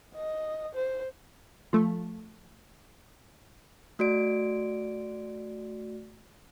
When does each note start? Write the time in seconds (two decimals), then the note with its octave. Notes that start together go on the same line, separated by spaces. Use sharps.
0.16 D#5
0.75 C5
1.73 F3 A3
3.99 A3 F#4 D5 D7